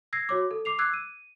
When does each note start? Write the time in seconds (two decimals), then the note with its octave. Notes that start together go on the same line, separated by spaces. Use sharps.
0.13 E6 G#6 A#6 C7
0.29 F#4 C#5 D6
0.51 A4
0.65 D6 C7 F7
0.78 D6 E6 F#6 G#6 C7
0.94 D#7